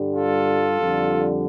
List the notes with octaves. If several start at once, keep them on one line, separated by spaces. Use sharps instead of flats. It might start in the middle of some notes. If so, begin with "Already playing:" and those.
Already playing: G2 D3 G3
F4 A4
F2 D3 G3